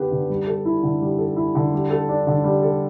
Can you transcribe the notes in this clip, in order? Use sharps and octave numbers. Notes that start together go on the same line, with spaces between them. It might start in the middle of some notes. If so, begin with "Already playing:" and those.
Already playing: D3 B3 G4 B4
D3
G3
A4
E4
D3
G3
A4
E4
D3
G3
A4
D4
D3
G3
A4